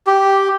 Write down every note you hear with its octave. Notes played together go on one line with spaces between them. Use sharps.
G4